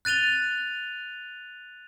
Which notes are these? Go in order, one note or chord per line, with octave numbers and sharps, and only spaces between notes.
F#6 A6 D#7 F7 G7